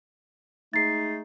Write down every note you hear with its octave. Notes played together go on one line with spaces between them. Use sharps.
G#3 A3 D#4 A6 C7